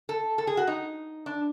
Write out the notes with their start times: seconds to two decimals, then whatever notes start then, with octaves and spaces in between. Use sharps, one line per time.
0.09 A4
0.38 A4
0.47 G#4
0.57 F#4
0.67 D#4
1.26 D4